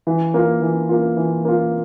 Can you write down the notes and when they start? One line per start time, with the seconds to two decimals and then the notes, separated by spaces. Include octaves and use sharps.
0.07 E3
0.34 A#3 F4
0.62 E3
0.89 A#3 F4
1.17 E3
1.45 A#3 F4